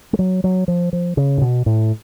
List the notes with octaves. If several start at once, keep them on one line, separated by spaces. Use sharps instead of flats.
G#3
F#3
F#3
F3
F3
C#3
A2
B2
A2